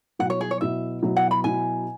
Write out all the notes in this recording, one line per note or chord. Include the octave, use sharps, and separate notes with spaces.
B2 F#3 E4 F#5
C#5
G#4
C#5
B2 F#3 E4 E5
B2 F#3 E4
F#5
B5
B2 F#3 E4 G#5